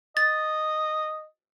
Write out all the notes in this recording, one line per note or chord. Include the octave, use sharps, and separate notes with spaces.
D#5 A6